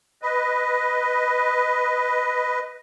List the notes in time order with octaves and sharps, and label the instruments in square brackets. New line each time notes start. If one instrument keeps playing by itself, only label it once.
[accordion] B4 D#5